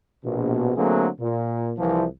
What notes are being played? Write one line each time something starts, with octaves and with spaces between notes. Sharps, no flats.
A#1 B2
D3 F#3 A3 A#3 C4 G#4
A#2
C2 E3 F3